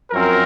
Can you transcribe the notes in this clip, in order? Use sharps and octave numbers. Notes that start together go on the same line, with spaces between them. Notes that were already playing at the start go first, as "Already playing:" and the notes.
F#2 F3 C4 A#4